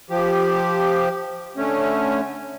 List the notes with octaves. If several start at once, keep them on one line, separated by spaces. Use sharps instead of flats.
F3 G4
D3 A3 C#4